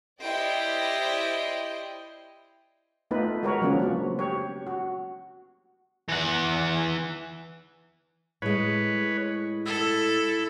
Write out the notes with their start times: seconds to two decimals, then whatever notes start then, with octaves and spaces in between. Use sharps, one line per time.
0.21 E4 G4 C5 D5 D#5 G5
3.11 A3 B3 D#4 F4 B4
3.43 G#3 F#4 A#4 B4 C#5
3.62 C#3 F3 F#3 A#3 C#4 D4
3.80 F3 F#3 B3
4.19 G4 C#5
4.67 F#4
6.09 E3 F#5
8.42 A2 G#3 B4 C#5
9.66 E4 A4